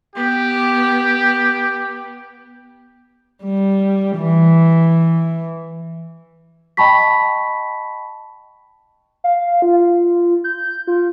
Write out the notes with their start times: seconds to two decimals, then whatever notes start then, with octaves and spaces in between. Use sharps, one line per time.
0.16 B3 G4
3.44 G3
4.17 E3
6.77 D#5 G5 A5 B5 C#6 B6
9.24 F5
9.62 F4
10.44 G6
10.87 F4